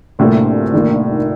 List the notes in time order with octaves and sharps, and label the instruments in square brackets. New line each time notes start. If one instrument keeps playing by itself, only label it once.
[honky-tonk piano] D2 C3 G3 A#3 F4 [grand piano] A2
[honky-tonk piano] G2 D#3 A#3 F4